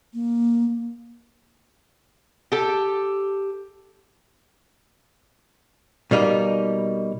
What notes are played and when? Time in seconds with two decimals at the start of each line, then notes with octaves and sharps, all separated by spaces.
0.14 A#3
2.52 G4 A4
6.11 B2 G3 A#3 D#4